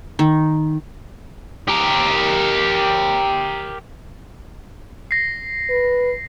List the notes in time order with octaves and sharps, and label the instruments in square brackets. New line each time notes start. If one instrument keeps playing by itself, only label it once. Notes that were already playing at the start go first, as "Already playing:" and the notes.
[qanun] D#3
[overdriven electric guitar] G4 A#4
[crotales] A#6 C7
[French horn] B4